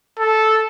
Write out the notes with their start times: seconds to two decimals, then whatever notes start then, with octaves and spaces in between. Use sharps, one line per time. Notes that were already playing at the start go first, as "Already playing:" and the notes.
0.19 A4